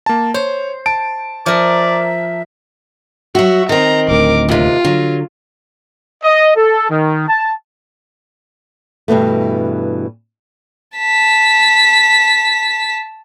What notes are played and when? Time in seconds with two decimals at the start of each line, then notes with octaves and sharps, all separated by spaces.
0.06 A#3 A5
0.34 C5 C#5
0.86 A5 D7
1.46 F3 A#4 D5 E5
3.35 F#3 F#4 E5
3.69 D#3 C4 A#5
4.08 D1 D2 A#4 D6
4.49 D#2 C3 F4
4.85 D3 F#3
6.24 D#5
6.57 A4
6.90 D#3
7.29 A5
9.08 G2 B2 E3 A3
10.97 A5 B6